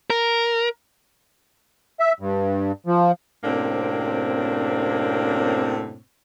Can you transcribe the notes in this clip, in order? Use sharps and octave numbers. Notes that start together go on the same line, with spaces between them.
A#4
E5
G2
F3
F#2 A2 C3 A#3 C4 D4